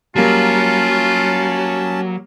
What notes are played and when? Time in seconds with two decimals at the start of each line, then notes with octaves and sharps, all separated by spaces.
0.16 F#3 G3 A#3 C#4 F4 A5